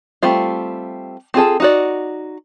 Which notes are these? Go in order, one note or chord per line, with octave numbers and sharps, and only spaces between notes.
G3 A3 C4 F4
C4 F4 G#4 A4
D#4 F#4 D5